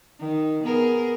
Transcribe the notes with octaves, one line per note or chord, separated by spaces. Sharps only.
D#3
B3 G#4 A#4